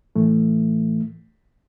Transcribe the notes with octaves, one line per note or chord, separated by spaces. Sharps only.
A2 E3 A3